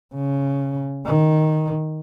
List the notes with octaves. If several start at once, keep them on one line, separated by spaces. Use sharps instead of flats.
C#3
D#3